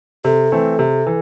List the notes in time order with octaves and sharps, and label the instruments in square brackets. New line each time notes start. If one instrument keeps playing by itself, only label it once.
[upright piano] C3 [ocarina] A4
[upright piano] E3 A3 C4
C3
E3